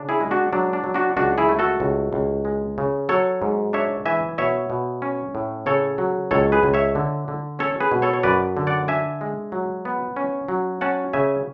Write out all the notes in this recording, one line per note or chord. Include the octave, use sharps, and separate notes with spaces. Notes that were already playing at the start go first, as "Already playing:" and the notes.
Already playing: C#3 D4
E4 G#4
G#3
D4 F#4
F#3 D4
D4
F#3
D4 F#4
C#2 D4 F#4
E4 G#4
A3
F#4 A4
C#2
C#2
G#3
C#3
F#3 A4 C#5
G#2
D4 C#5 E5
E3 E5 G#5
B2 C#5 E5
B2
C#4
A2
C#3 A4 C#5
F#3
C#2 A4 C#5
G#4 B4
C#2
C#5 E5
D3
D3
C#4 A4 C#5
G#4 B4
B2
A4 C#5
C#5
F#2 B4 D5
D3
D5 F#5
D4 E5 G#5
G#3
F#3
B3
C#4
F#3
C#4 F#5 A5
C#3 E5 G#5